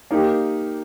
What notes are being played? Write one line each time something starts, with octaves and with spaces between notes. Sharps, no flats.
A#3 D#4 G4